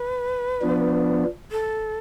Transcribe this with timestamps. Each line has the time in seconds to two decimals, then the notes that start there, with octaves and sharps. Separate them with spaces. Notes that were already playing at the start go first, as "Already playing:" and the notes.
Already playing: B4
0.61 F3 B3 D4
1.52 A4